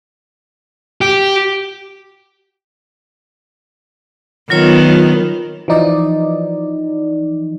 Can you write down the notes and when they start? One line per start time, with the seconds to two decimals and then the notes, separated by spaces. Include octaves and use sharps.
1.01 G4
4.50 D#3 F#3 B3 F4 C#5
5.68 E3 F3 D#4 D5